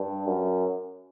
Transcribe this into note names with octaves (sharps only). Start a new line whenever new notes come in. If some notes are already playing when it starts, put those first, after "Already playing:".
Already playing: G2
F#2